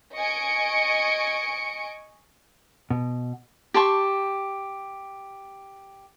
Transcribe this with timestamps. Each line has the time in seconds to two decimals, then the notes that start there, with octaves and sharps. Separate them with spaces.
0.15 D#5 G#5 C#6 C#7 D7
2.91 B2
3.74 G4 A5 C6 C#6